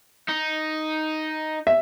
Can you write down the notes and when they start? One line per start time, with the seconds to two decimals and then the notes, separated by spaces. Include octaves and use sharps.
0.28 D#4
1.67 E5